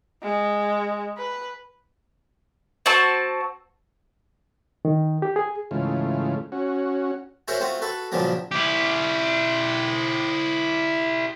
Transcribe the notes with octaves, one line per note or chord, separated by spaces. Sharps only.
G#3
B4
C4 F#4 A5
D#3
G4
G#4
G#2 C#3 E3 A3 F4
C#4 F#4
E4 F#4 G#4 A#4 C5 C#5
A3 C4 F4 F#4
F#4 A4 B4
G2 A#2 C#3 F3 F#3 A#3
E4 G4